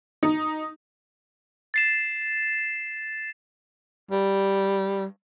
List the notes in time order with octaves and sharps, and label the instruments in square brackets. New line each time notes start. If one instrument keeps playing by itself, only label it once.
[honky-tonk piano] D#4
[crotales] A6 C7 E7
[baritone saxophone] G3